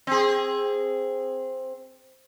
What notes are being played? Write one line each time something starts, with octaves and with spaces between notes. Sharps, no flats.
C4 G#4